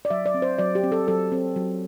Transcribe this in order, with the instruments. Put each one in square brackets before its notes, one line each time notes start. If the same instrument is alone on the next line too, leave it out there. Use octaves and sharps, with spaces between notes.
[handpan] D5
F#3 E5
D5
C4
C5
F#3 D5
G4
C4
A4
F#3 A4
C4
F#3